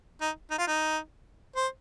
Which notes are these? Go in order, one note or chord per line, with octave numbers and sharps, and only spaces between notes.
D#4
D#4
F4
D#4
C5